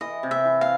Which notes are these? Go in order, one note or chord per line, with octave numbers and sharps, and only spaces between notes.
E3 D#5
C3
E5
E3
F5